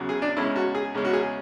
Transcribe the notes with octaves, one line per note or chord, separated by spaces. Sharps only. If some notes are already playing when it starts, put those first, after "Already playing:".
Already playing: E2 C#3 F#3
G#4
D4
E2 C#3 G#3 C#4 E4
F#4
G#4
E2 C#3 G#3 C#4
F#4
G#4